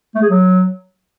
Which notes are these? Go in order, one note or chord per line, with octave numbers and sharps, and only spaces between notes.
A3
G#4
F#3